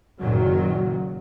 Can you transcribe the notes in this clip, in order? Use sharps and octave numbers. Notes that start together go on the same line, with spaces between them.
F#1 A#2 D#3 F#3